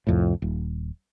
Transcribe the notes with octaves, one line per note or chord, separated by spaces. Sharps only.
C2 F2 A2
D#1